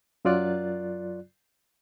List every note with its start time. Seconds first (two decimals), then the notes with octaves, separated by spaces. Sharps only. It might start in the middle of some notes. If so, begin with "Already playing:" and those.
0.25 F#2 F#3 F4 D5 F#6